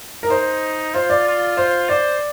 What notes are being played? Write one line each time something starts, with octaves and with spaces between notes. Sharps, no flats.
A#4
D#4 C5
F4 C5
D5
F4
C5
C5 D5